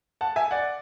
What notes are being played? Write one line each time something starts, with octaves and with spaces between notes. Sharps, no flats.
F#5 A5
E5 G#5
D5 F#5